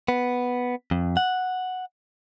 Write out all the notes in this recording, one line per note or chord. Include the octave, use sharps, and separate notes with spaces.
B3
F2
F#5